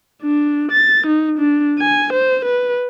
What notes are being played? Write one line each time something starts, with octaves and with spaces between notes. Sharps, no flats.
D4
A6
D#4
D4
G#5
C5
B4